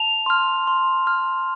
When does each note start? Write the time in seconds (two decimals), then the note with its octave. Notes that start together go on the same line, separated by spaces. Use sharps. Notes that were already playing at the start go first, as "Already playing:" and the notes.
Already playing: A5 F7
0.26 C6 F6
0.67 C6
1.07 F6